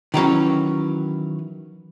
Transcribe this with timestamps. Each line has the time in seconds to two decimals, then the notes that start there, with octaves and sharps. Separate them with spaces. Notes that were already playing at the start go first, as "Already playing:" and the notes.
0.14 D#3 E3 F#3 C#4